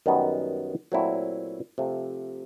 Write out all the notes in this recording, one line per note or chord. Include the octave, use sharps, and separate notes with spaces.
F#2 D#3 G3 B3
A#2 F#3 A3 C4 E4
C3 F3 A3